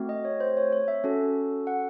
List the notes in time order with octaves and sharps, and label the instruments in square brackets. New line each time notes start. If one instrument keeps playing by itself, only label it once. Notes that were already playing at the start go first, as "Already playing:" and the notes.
Already playing: [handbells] A3 C4 F#4
D#5
C#5
C5
C#5
C#5
E5
C#4 F#4 A4
F#5